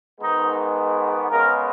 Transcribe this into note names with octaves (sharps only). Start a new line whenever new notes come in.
G#2 D#3 G#3 B3 D#4
C#3 G#3 B3 A#4